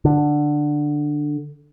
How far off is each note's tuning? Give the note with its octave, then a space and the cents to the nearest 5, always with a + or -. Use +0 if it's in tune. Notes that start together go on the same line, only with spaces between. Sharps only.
D3 +10